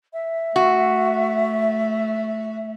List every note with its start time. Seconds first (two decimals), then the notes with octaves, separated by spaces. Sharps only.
0.13 E5
0.56 A3 F#4